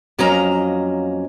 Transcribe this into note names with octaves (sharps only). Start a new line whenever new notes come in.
F2 F#3 A#3 C#4 D#5 A#5